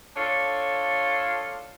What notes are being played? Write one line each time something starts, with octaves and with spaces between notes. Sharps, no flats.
D4 F4 A4 C#5